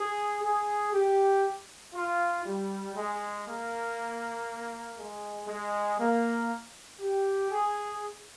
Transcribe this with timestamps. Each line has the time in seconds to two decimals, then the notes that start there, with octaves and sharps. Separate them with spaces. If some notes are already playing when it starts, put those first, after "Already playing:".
Already playing: G#4
0.43 G#4
0.93 G4
1.94 F4
2.45 G3
2.96 G#3
3.46 A#3
4.98 G#3
5.48 G#3
5.99 A#3
7.00 G4
7.51 G#4